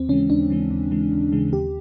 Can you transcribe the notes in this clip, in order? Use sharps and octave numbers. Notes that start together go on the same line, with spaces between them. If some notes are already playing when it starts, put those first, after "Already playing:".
Already playing: D#2 C4
C#3 E3 G#3 C#4
D#2 D4
C#3 E3 G#3
D#2
C#3 E3 G#3
D#2
C#3 E3 G#3
D#2 G4